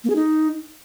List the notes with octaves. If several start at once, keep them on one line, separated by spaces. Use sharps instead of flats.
A#3
G#4
D#4